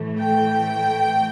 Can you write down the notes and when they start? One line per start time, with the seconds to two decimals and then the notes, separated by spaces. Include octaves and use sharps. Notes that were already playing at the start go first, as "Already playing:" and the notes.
Already playing: A2 E3 A3
0.20 G5